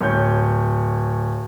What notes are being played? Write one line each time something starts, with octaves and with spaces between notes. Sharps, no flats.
D1 C#5 G6